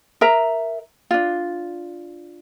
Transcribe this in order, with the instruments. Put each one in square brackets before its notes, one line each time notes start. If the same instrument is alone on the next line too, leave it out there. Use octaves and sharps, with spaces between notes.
[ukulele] A#4 E5 A#5
D4 F4